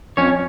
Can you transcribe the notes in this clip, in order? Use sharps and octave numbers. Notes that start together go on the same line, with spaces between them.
F2 C#4 C#5